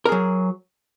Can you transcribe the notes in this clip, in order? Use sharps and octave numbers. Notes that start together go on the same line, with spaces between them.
F#3 G#4 A#4